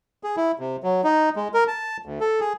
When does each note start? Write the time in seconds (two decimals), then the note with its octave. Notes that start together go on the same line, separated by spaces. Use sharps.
0.23 G#4
0.37 E4
0.59 C3
0.83 F#3
1.04 D#4
1.36 G#3
1.54 A#4
1.68 A5
2.06 D2
2.20 A4
2.40 G#4